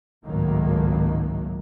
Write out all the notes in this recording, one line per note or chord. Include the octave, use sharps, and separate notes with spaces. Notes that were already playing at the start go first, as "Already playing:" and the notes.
G#1 C#2 A2 D#3 F#3 A#3